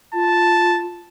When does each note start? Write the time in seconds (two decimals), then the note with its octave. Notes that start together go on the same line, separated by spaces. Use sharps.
0.14 F4 A5